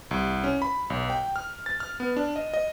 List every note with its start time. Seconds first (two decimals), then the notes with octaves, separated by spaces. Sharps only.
0.11 C2
0.44 C#4
0.62 B5
0.90 B1
1.10 G5
1.36 F6
1.66 A6
1.80 F6
2.00 B3
2.17 D4
2.36 D#5
2.54 D#5